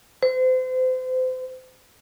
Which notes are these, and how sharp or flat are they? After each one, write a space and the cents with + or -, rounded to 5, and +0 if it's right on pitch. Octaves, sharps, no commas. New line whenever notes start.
C5 -35